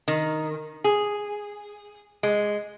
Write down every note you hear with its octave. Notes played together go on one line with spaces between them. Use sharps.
D#3
G#4
G#3